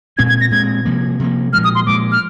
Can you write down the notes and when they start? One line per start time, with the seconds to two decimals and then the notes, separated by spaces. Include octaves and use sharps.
0.18 A#2 G#3 C4 G#6
0.29 G#6
0.41 A#6
0.51 A#2 G#3 C4 G#6
0.85 C3 F3 A#3
1.20 C3 F3 A#3
1.53 A#2 F3 G#3 F6
1.64 D#6
1.75 C6
1.86 A#2 F3 G#3 D6
2.12 F6